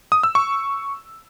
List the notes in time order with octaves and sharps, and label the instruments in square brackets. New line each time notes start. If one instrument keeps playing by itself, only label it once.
[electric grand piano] D#6
E6
C#6